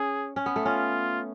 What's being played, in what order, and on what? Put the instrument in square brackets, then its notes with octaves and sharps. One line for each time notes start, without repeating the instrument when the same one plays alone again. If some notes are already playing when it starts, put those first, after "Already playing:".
Already playing: [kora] C#4 [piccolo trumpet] G#4
[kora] C#4
B3
A3
[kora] C#4 [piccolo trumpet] F4